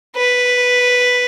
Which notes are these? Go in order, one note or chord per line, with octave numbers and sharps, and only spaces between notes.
B4